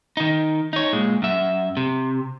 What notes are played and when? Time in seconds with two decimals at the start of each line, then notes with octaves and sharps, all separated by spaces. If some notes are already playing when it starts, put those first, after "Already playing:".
0.17 D#3 D#4
0.73 D#4 C#5
0.93 A#2 G#3
1.22 F#2 E5
1.77 C3